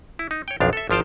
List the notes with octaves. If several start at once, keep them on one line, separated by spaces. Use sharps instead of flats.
E4
D#4
C#5 G5
B1 F2 F3 D4 F5
A4 E5
G#1 F3 F5 G5 A5